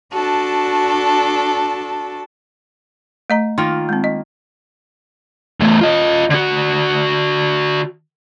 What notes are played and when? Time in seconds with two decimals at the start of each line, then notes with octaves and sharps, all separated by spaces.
0.13 D4 F#4 A4 A5
3.30 A3 D#5 A#5
3.58 D#3 A#3 F4 C6
3.89 G#3 C4
4.04 D#5
5.60 E2 A3
5.81 F4 D#5
6.30 D3 F#4